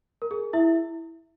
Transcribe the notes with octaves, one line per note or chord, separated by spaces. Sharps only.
A#4
G#4
E4 E5